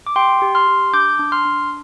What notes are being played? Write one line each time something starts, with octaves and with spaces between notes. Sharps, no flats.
D6
G4 G5 C6
G4
C6 F6
G4
D4 D6 G6
D4
C6 F6
D4